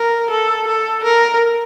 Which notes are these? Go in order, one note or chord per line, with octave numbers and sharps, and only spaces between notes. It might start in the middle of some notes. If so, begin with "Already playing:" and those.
Already playing: A#4
A4
A4
A#4